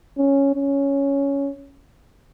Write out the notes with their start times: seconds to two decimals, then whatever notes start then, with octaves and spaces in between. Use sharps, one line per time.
0.18 C#4
0.54 C#4